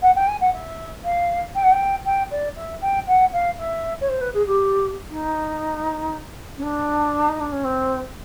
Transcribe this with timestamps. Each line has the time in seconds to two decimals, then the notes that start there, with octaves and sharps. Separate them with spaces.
0.02 F#5
0.15 G5
0.28 G#5
0.41 F#5
0.53 E5
1.04 F5
1.55 G5
1.63 F#5
1.72 G5
2.05 G5
2.31 D5
2.56 E5
2.81 G5
3.07 F#5
3.32 F5
3.58 E5
4.01 C#5
4.09 C5
4.21 B4
4.34 G#4
4.47 G4
5.10 D#4
6.58 C#4
6.62 D4
7.29 D#4
7.40 D4
7.52 C#4
7.64 C4